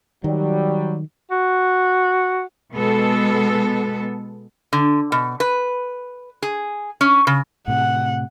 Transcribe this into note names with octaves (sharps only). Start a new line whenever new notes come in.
D#3 F#3 G3
F#4
B2 G#3 B3 A4
D3
B2
B4
G#4
C#4
C#3
A2 C3 F#5